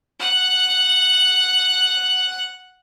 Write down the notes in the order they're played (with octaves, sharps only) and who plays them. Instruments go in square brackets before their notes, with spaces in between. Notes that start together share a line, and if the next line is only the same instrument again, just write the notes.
[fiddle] F#5 F#6